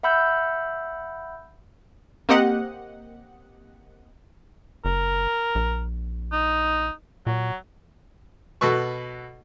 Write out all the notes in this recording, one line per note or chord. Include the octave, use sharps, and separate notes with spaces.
E5 F#5 B5 E6 G6
A#3 C4 G4 D#5 F#5
F#1 A#4
A#1
D#4
A#2 F#3
B2 F#4 A4 B4 C#6